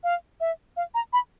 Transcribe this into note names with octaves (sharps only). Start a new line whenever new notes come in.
F5
E5
F5
A#5
B5